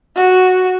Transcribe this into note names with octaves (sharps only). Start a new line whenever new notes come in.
F#4